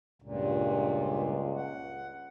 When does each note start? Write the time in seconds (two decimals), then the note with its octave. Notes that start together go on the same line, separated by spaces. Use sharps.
0.22 C#2 G2 A#2
1.56 F#5